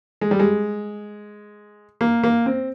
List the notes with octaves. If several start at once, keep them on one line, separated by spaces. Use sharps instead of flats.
G#3
G3
G#3
A#3
A#3
C4